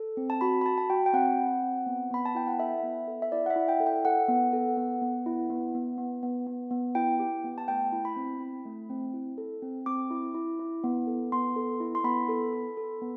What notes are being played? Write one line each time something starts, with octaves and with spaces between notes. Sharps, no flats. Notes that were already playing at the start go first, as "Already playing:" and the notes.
Already playing: A4
C4
A5
F#4 B5
B5
F#4 A5
A5
F#4 G5
G5
C4 F#5
C4
C4
B3
B3 B5
A5
E4 G5
F#5
A4 E5
B3
A4
E5
E4 D5
F#5
E5
E4
G5
A4
G5
A4 F#5
B3
A4
B3
B3
E4
B3
B3
B3
B3
B3
B3
E4 G5
G4
B3
A5
A3 G5
E4
B5
C4
E4
A3
C4
E4
A4
C4
C4 D6
E4
E4
E4
B3
A4
B3 C6
A4
E4
C6
B3 B5
A4
A4
A4
B3